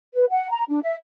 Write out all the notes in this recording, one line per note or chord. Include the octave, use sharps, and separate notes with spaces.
B4
F#5
A#5
D4
E5